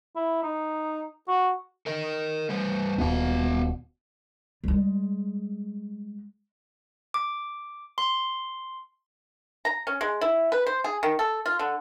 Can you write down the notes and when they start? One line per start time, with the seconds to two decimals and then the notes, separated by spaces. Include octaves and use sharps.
0.16 E4
0.43 D#4
1.28 F#4
1.86 A#4 D#5
2.49 G3 B4 C5
2.98 D#1 B2 B3 F5
4.64 G3 G#3
7.14 D6
7.98 C6
9.65 A#5
9.87 C#4
10.01 G#3
10.21 E4
10.52 B4
10.66 C5
10.84 G#4
11.03 D#3
11.19 A4
11.46 F4
11.59 D3